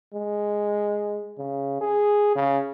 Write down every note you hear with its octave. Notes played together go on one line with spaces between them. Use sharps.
G#3
C#3
G#4
C#3